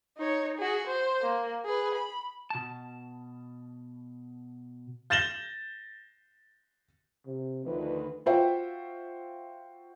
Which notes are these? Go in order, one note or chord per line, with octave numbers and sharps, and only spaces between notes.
D#4 C#5
F#4 G#4
C5
A#3
G#4 B4
B5
B2 A5
G6 A6 A#6 E7 F#7 G7
C3
D2 D#3 F3 B4
F4 F#4 C5 E5 G5